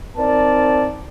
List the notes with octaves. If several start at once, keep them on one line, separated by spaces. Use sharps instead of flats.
C4 D#4 A#4 D5 A5